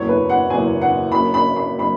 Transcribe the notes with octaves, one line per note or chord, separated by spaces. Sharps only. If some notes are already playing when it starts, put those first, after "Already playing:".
Already playing: F#1 E2 B2 F#3 C#5
B4
F#5
F#1 E2 B2 F#3 G#5
F#5
F#1 F#2 F#3 B5
B5
B5
F#3 B5